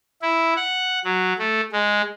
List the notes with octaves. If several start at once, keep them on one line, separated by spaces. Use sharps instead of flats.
E4
F#5
F#3
A3
G#3